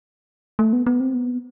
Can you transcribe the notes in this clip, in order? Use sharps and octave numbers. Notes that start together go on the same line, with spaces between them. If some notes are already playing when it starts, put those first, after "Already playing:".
A3
B3
B3
C4
B3